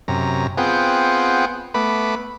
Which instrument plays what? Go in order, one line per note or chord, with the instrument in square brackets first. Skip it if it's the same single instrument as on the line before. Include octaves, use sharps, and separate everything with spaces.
[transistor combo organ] F#2 C3 A#5
B3 C4 F4 G#4 F#5 G5
A3 B3 B4 B5 D6